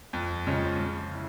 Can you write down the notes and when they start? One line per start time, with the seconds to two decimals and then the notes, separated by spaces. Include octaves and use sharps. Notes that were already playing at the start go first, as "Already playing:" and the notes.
0.13 F2
0.47 C#3 F3 G#3 C#4
0.80 C#3
1.14 E4